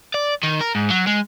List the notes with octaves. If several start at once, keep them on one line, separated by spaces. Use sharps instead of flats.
D5
D#3
A#4
G#2
F#3
G#3